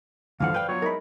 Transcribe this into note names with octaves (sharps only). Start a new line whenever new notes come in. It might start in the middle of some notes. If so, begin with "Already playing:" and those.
D2 G2 D3 E3 F3 F5 F#5
F2 B4 D5 G5 G6
F#3 B3 F4 C#5
G#3 D#4 E4 A#4 B5